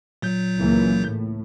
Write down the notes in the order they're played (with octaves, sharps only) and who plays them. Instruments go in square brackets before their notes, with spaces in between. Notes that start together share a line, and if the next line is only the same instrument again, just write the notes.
[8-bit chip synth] A#2 F#3 G6
[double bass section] C#2 E3 A#3
A2